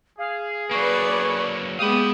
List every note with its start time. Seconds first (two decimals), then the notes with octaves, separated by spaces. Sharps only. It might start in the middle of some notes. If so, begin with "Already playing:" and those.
0.19 G#4 F5
0.71 F#3 A#3 B4 D5 C#6
1.79 G#3 B3 G4 F5 B5 D#6 D#7